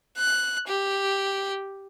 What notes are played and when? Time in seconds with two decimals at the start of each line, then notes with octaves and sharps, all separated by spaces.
0.17 F#6
0.68 G4